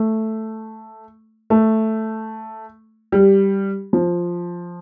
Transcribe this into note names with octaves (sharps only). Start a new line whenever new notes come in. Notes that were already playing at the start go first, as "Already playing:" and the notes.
Already playing: A3
A3
G3
F3